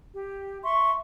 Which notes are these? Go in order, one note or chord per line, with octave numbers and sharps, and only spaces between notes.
G4
E5 C6 C#6